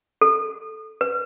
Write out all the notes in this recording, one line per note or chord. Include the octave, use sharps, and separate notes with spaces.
A4
B4